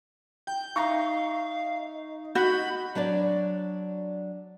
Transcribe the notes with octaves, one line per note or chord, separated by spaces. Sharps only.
G5 G6
D#4 E5 F5 A#5 C#6
F#4 B5 G6
F#3 D4 C#5 D5